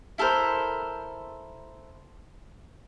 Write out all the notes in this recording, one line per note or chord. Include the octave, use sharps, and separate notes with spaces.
E4 A4 A#4 C5